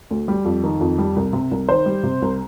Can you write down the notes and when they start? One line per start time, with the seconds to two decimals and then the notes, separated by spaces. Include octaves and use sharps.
0.11 D2
0.28 G3
0.45 F2
0.64 D#3
0.81 F2
0.98 G3
1.16 C2
1.33 C3
1.51 C2
1.69 D#3 C5
1.86 G3
2.03 C3
2.22 C2